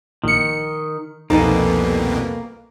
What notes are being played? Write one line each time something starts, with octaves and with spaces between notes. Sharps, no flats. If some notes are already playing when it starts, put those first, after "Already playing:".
A#1 D#3 C#7
C2 F2 B2 A#3 D#4 A4 B4 G#5